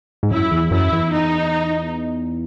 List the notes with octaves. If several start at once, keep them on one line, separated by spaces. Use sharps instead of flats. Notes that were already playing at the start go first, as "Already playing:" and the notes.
G#2
F#2 E4
E2
F#2 E4
E2
D#4